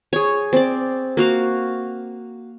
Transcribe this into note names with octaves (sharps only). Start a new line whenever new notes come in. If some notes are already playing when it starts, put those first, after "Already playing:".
G#4 C#5
C4 D5
A#3 F#4 F5